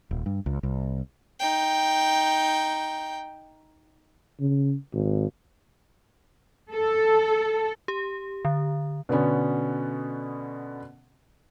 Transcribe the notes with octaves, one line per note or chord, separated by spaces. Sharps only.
D#1
G2
C#2
C2
D#4 G5
C#3
G#1
A4
G4
D3
B2 D3 B3 C#4